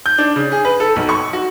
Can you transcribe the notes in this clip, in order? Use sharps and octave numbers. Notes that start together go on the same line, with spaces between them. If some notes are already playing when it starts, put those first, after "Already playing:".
G6
D4
C#3
G#4
B4
A4
B1
C#6
F#4